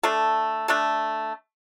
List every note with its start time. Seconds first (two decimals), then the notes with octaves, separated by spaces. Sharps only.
0.03 A3 D4 A4
0.68 A3 D4 A4